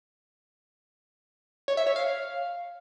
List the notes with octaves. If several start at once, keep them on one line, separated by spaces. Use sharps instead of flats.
C#5
E5
C#5
F5